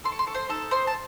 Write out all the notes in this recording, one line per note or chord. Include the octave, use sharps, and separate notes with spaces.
A4 C6
C#6
C6
A4 C#6
C5 C6
D#4 A4 A5
D#4 C5 C6
A5